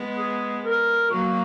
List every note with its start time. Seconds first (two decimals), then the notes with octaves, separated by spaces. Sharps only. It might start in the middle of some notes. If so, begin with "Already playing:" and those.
Already playing: G#3 B3
0.17 G#4
0.64 A#4
1.10 F#3 A#3 F#4